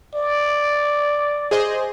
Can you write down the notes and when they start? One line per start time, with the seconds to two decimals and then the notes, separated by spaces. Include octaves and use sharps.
0.15 D5
1.51 G#4 C5 D#5